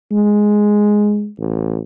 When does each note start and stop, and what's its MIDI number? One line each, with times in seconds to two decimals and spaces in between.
0.11 1.30 56
1.38 1.79 33